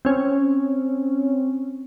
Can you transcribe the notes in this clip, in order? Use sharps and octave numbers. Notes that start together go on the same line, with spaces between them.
C4 C#4